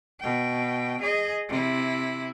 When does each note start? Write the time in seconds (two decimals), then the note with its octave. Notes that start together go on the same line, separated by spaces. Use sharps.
0.20 B2 G5
1.01 G#4 D#5
1.49 C3 E4